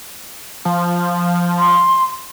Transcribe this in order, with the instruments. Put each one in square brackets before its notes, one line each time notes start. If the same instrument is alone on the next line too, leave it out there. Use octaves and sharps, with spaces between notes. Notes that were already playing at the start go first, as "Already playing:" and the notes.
[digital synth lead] F3
[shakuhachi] C6